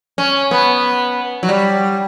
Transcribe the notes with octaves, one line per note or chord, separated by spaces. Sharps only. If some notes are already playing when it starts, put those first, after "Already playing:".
C#4
B3
F#3
G3